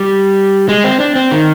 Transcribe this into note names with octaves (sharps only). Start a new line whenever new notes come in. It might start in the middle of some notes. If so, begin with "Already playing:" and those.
Already playing: G3
G#3
C4
D4
C4
D#3